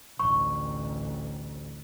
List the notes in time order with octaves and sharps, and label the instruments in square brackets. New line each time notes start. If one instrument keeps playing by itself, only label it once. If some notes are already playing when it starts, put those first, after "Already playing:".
[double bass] A1 D2 [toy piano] C#6